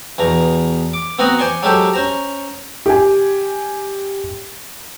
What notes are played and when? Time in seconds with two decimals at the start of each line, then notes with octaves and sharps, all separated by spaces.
0.18 E2 B2 A#5
0.94 D6
1.19 B3 C4 F#4 F#5 A#5 D#6
1.39 C5 D5 G#5 C6 C#6
1.63 F#3 G#3 G4 A4 C5
1.94 C#4 C5 A#5
2.86 G4 G#5